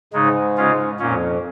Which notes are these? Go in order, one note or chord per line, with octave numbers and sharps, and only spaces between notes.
G#2 C#3 G#3 D#4
C#3 G#3 C#4 F4
F2 A#2 A#3 C#4